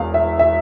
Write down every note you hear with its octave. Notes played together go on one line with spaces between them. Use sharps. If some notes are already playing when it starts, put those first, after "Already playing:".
Already playing: E1 E2 F5
E5
E5